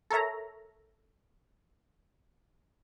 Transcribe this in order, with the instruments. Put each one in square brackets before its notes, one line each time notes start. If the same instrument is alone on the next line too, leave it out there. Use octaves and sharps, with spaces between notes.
[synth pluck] A4 A#4 C#5 E5 A#5